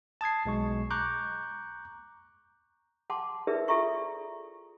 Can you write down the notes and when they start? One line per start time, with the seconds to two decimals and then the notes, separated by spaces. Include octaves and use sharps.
0.21 A5 D#6 G#6 C7
0.45 B1 G#3 C#6
0.90 A#5 C#6 D6 F#6 G6
3.10 F#5 A5 C6 D6
3.47 E4 G#4 A#4 B4 D5 E5
3.68 F4 G#4 A4 E5 A#5 C#6